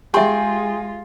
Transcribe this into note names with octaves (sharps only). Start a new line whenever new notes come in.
G#3 F4 G4 G#4 E5 G5 C6